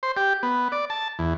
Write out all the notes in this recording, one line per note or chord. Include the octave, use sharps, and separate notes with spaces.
C5
G4
B3
D5
A5
E2